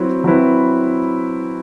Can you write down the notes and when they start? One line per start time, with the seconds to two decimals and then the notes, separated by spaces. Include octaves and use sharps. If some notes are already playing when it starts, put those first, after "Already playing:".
Already playing: F#3 C4 E4 B4
0.24 F#3 C4 E4 B4